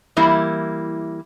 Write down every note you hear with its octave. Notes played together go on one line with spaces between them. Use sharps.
E3 G3 A#3 E4